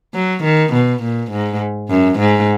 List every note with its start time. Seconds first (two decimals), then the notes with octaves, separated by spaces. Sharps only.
0.14 F#3
0.44 D#3
0.73 B2
1.03 A#2
1.31 G#2
1.90 F#2
2.19 G#2